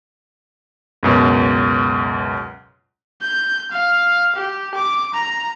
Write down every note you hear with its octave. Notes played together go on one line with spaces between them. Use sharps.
C#2 F#2 B2
G6
F5
G4
D6
A#5